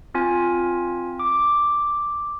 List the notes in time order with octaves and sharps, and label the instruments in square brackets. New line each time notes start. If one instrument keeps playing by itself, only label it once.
[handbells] C4 F4 G#5
D6